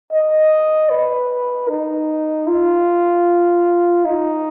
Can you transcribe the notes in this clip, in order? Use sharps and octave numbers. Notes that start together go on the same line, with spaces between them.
D#5
B4
D#4
F4
D#4